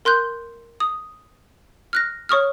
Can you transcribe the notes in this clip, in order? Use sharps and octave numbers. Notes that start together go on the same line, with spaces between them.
A#4 C6 F#6 G6
D#6
F6 F#6 A#6
C#5 C#6 D#6 F6